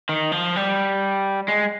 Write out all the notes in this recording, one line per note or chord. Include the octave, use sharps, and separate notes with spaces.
D#3
F3
G3
G#3